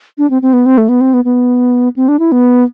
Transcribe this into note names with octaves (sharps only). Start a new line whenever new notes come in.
D4
C4
C4
B3
C4
A3
B3
C4
B3
B3
C4
D4
E4
B3